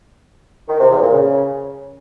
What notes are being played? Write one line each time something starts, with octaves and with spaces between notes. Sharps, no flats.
D#3
C3
E2
A#2
C#3